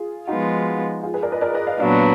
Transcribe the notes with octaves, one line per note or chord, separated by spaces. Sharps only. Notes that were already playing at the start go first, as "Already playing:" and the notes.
Already playing: F4 G#4
F3 G#3 B3 D#4 F4 F#4
F4 G#4
G#4 B4
A#4 D5
B4 D#5
A#4 D5
B4 D#5
D5 F5
A#2 F#3 B3 D4 D5 F5